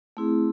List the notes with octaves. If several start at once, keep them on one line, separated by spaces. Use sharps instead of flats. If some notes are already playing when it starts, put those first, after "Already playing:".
A3 C4 E4 G#4